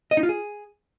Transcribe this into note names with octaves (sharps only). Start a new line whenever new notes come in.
D#5
D#4
F4
G#4